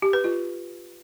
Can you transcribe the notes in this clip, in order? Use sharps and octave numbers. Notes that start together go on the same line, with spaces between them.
G4
B4
F4